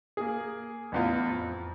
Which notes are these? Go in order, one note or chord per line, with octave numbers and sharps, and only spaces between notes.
A#3 G#4
A1 E2 F4
F2